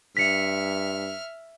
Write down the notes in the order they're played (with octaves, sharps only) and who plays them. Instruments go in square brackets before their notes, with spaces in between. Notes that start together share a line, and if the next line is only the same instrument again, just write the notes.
[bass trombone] G2 [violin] E5 F6 [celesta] B6 C#7